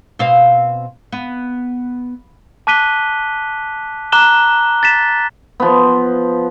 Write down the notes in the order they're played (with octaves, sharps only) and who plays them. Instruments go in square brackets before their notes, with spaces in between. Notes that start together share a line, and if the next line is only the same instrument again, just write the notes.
[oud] B2 C4 F5
B3
[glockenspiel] A5 D6 F#6 B6 D#7 G7
A#5 D6 F#6 E7 G7
A6 B6 E7
[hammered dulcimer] F3 B3